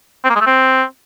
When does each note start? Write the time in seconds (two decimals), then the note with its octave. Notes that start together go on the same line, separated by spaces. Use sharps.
0.24 C4
0.30 A#3
0.35 G#3
0.41 A3
0.46 C4